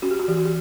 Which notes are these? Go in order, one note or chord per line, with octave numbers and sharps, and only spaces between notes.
C#4 F#4
G4
F#4
E3 G4
F#4
G4